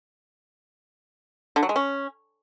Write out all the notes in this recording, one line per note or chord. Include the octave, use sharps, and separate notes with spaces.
D3
F#3
G#3
C#4